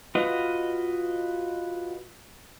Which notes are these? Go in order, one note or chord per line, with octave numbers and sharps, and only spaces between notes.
F4 F#4 B4 D#5